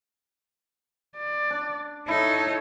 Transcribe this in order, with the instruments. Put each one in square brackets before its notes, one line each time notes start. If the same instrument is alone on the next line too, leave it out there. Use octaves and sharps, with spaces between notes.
[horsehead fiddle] D5
[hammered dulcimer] D4
[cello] D#4 [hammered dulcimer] E4 [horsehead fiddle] A4 C#5